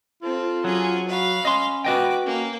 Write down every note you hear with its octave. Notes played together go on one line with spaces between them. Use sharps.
C4 F4 A4
F#3 C#4 G#4
F#4 F5 B5
C#4 D#5 C6
F#4 B4 D#5 G5 D6
A#3 C#4